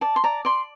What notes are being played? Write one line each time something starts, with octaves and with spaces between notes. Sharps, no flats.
D5 A5
C6
D5 A#5
D5 C6